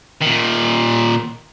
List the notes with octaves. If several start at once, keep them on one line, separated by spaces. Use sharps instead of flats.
A#2 D#3